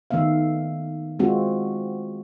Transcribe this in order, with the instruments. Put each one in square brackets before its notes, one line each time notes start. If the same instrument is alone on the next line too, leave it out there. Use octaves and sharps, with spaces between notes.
[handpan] D#3 A3 B3 E5 F5
G#3 C4 F4 F#4